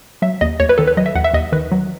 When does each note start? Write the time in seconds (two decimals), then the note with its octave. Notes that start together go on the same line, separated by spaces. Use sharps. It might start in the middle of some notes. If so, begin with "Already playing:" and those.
0.22 F#3 E5
0.41 D#2 D#5
0.60 D#2 C#5
0.69 B4
0.78 D#3 A4
0.87 B4
0.97 F#3 D#5
1.06 E5
1.15 D#2 F#5
1.24 E5
1.34 D#2 D#5
1.52 D#3 B4
1.72 F#3